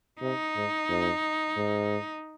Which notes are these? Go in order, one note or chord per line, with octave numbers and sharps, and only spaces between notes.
C3 D#4
G#2
F2
G#2